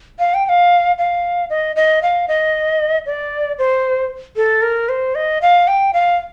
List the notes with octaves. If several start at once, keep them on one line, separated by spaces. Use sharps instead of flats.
F5
G5
G5
F5
F5
D#5
D#5
F5
D#5
D5
C5
A4
A#4
C5
D#5
F5
G5
F5